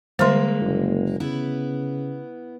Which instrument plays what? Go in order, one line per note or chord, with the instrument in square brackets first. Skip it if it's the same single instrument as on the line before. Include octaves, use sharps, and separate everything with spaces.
[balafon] D3 G3 C5 [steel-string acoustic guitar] G#3 A#3
[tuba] F#1
[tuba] C#3 [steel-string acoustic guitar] B3 E4 B4